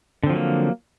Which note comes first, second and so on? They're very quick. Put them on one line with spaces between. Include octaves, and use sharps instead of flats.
D3 C4 F3 F#3 A#3